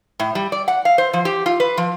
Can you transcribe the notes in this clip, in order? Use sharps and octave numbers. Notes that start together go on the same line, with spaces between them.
A2
G3
D5
F#5
F5
C5
F3
G4
F4
B4
F3